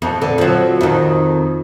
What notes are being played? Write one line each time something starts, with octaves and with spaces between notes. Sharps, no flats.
F2
D3
F3 F#3
F2 D#3